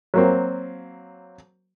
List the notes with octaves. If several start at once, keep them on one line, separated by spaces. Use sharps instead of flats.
F#3 A#3 C4